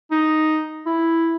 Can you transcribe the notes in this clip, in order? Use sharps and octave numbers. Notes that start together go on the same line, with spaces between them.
D#4
E4